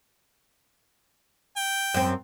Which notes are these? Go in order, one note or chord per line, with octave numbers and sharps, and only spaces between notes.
G5
F#2 C4